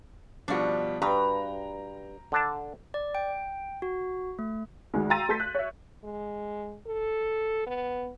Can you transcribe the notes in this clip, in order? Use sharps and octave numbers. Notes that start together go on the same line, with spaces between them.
B2 F3 G3 D4 F#4
G2 B4 G5 A#5
D3 D4 A5
D5
G5
F#4
A3
D2 D#3 G#3
G5 A#5 C6 E6 A6 D#7
A3 A4 C6 G6 B6
F#6
C#5 E5
G#3
A4
B3